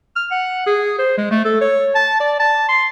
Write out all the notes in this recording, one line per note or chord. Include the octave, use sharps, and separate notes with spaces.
F6
F#5
G#4
C5
G#3
A3
A4
C#5
A5
D5
A5
C6